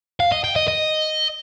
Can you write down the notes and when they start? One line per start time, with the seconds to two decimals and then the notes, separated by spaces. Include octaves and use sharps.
0.20 F5
0.32 D#5
0.44 G5
0.56 D#5
0.68 D#5